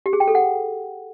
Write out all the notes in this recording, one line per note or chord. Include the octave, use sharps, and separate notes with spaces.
G4
G#4
G5
A4
F#5